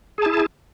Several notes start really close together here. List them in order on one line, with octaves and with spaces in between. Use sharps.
G#4 A5 E4